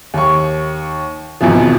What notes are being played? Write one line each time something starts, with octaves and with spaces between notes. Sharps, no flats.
D#2 C#6
G#1 E2 B2 E3 F3